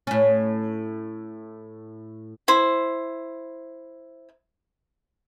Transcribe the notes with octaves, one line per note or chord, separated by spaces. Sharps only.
A2 C#4
E4 C5